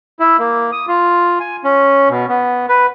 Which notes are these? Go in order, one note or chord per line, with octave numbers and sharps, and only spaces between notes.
E4
A#3
D#6
F4
G#5
C#4
B2
B3
B4